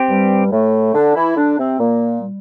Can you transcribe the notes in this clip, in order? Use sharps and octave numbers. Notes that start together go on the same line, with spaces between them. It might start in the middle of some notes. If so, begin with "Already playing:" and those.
Already playing: C4 G4
G2 G3
A2 A3
D3 D4
E3 E4
D3 D4
C3 C4
A#2 A#3
G3